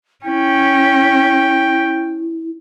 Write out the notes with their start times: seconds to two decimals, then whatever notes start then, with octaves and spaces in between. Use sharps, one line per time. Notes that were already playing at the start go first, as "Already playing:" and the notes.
0.25 C#4 E4 G5